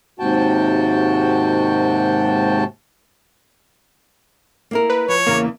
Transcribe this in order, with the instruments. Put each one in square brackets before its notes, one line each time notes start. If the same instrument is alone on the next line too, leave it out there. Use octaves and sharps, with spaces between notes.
[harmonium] D#2 G#2 C3 F#4 G5 A5
[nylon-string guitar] A#3 E4 A#4
[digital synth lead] B4
[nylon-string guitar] F3 [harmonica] C#5
[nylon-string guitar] E2 C#3 E3 [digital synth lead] A#3